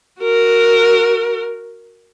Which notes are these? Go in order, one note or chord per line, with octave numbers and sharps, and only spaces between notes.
F#4 A#4